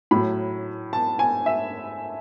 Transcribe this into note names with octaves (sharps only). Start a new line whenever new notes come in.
A2 F#3 B5
A5
G#5
E5